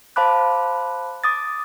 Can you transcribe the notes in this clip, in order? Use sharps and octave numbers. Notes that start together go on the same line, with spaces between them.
C5 F5 A5 B5 D6 F#6
D6 D#6 A6